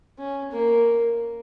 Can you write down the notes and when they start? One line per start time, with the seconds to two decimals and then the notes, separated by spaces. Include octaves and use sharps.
0.18 C#4
0.53 A#3